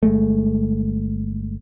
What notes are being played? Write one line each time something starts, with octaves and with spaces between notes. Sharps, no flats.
G1 G#3 A3